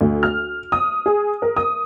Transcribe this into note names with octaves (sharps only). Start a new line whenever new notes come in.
D2
F6
D#6
G#4
A#4
D#6